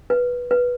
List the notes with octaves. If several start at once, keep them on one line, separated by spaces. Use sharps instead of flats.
B4
B4